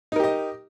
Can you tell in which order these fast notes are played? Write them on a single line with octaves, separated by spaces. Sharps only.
D#4 A#4 G4 D#5